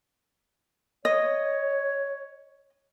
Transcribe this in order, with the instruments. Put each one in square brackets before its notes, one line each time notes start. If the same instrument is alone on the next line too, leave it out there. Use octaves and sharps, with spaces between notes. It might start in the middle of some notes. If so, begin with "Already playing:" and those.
[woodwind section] C#5 [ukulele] D#5